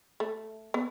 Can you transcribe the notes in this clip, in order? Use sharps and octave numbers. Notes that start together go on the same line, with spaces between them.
A3
B3